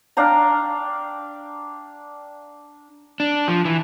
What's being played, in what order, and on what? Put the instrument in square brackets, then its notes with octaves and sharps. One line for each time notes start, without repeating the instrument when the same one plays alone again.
[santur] D4 F5 G5 A#5
[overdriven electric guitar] D4
F3
E3